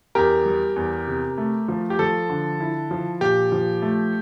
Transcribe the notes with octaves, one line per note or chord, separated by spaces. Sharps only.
E2 G4 A#4
G3
E2
C3
A3
F3
G4
F3 A4
D3
E4
F3
A#2 G4
F3
A3